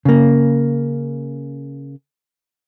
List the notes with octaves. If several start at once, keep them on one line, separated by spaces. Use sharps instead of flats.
C#3 A#3